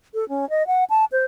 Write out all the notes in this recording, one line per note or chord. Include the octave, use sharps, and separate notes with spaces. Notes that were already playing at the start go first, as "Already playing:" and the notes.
A4
C#4
D#5
F#5
A5
C5